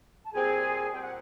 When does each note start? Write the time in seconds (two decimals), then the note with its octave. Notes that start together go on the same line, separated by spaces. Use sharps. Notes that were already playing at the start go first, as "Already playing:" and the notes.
0.24 A5
0.32 A#2 G3 C4 G#4 G#5
0.93 A#2 G3 C4 G5
1.02 F#5